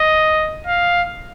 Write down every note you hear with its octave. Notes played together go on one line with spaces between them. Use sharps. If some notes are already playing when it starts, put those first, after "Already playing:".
Already playing: D#5
F5